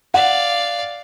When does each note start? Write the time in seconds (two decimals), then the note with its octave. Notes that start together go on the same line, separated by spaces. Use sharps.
0.14 D5 F5 F#5